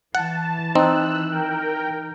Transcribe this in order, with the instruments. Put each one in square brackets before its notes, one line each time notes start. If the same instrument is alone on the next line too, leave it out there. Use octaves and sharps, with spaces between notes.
[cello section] E3 [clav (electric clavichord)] F#5 [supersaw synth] A5
[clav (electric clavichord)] C4 [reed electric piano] D#4 [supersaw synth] E6 F#6
[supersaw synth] A#4 G5